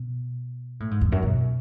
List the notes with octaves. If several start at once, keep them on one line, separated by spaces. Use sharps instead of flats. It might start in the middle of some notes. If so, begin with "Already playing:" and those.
Already playing: B2
A2
G#2
E2
F#2
B2